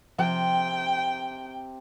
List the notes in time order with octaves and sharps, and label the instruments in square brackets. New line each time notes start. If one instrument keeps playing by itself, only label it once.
[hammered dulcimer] C3 [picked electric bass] F3 [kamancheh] G5